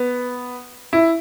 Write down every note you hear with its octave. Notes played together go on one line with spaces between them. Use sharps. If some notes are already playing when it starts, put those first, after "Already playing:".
Already playing: B3
E4